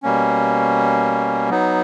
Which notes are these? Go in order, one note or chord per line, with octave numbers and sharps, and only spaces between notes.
B2 G3 A#3 C#4
F#3 B3 D#4